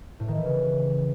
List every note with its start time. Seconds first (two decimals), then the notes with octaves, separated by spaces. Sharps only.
0.20 A2
0.28 D#3
0.37 E3
0.45 C#3